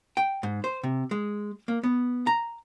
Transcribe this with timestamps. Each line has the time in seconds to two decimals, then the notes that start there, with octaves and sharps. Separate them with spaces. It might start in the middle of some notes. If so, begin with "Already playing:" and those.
0.17 G5
0.43 G#2
0.64 C5
0.83 C3
1.11 G#3
1.68 A#3
1.83 B3
2.27 A#5